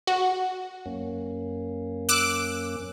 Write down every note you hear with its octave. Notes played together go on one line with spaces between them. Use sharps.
F#4
F#2 A#3 C#4
D6 E6 F#6